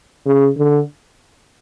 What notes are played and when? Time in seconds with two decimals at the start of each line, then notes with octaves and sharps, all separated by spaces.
0.26 C#3
0.58 D3